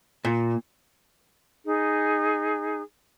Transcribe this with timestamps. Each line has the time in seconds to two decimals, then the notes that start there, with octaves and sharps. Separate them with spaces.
0.25 A#2
1.66 D#4 G#4